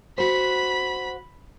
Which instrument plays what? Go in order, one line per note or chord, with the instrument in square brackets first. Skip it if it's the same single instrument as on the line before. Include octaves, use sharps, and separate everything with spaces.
[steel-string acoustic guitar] F#4 C5 [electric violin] B5 B6